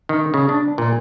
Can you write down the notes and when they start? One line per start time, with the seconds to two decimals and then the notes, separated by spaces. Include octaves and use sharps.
0.09 D#3
0.34 C#3
0.49 D4
0.78 A#2